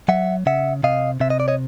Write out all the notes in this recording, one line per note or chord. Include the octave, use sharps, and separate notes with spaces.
F#3 E5 F#5
C#3 E5 F#5
C3 D#5 F5
C3 E5
D#5
D5
C#5 D#5